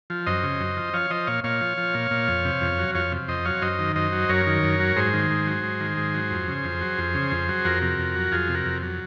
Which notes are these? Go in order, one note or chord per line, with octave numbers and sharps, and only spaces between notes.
F3
F#2 C5 D#5
C#3
F#2
F3
F3 C#5 F5
F3 C5 D#5
A#2 C#5 F5
A#2 C#5 F5
F3
F3
A#2
A#2
F2
C3
F2
F#3
F2 C#5 F5
C3
F2 C5 D#5
F#3 C#5 F5
F#2 C5 D#5
D#3
F#2 C5 D#5
F#3
F#2 A#4 C#5
D#3
F#2
F#3
G#2 G#4 C5
D#3
G#2
F#3
G#2
D#3
G#2
F#3
F2
C#3
F2
F#3
F2
C#3
F2
F#3
F2 F#4 A#4
C3
F2
F#3
F2 F4 G#4
C3
F#4 A#4
F2
F#3